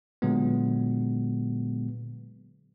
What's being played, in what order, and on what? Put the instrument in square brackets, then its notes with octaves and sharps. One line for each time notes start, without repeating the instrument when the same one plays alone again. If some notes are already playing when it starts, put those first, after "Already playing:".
[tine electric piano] A#2 D3 F#3 G#3 B3